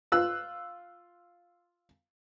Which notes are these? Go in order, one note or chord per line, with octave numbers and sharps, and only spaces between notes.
F4 E6 F#6